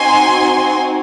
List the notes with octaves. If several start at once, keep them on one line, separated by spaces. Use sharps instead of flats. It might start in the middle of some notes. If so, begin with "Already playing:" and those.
Already playing: C4 D#4 F#4 G#5 C6